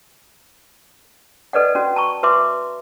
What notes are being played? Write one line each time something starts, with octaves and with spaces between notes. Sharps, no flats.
A4 B4 D5 D#5 F#5
C#4 F#4
A5 A#5 C#6
F#4 B4 E5 C6 D6